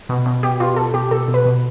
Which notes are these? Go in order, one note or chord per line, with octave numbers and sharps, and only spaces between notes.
B2
B2
B2 G4
B2 F4
B2 A4
B2 G4
B2 A4
B2
B4
B2